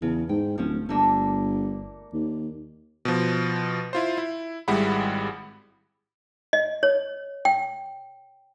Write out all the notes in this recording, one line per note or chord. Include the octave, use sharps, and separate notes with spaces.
E2 C#3
G#2 G5
D1 F3 C#4
G1 A3 A#3 D4
D#2
B2 F3
E4 F4 C5
E4
G#1 G3 G#3 E4 F#5 B5
D#5
C#5
G5